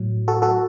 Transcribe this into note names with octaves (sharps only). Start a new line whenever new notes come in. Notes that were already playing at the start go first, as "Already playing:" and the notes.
Already playing: A2 F#3
F#4 A4
F#4 A4